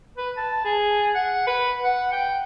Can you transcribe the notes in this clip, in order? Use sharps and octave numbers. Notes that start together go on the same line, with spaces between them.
B4
A5
G#4
F#5
B4
F#5
G5